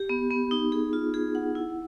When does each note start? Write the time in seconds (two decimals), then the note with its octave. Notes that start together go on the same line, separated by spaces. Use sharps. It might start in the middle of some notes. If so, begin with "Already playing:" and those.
Already playing: G4
0.09 B3
0.31 B3
0.51 D#4
0.72 G#4
0.93 F4
1.14 G#4
1.35 F#5
1.55 E4